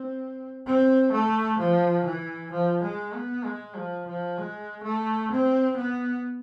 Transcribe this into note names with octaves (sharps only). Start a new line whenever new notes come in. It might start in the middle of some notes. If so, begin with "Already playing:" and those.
Already playing: C4
C4
A3
F3
E3
F3
G#3
B3
G#3
F3
F3
G#3
A3
C4
B3